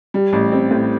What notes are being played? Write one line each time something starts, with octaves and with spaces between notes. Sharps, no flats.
G3
A1
C4
A2